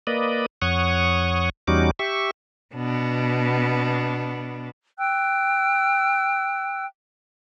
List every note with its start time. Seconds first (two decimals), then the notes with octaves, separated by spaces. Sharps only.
0.07 A#3 B4 D5 D#5
0.62 F2 C#5 F#5 C#6 D#6
1.68 E2 G3 C#4 D#4 F#4 D6
1.99 G4 E5 C#6
2.75 B2 B3 D4
4.98 G5 E6 F#6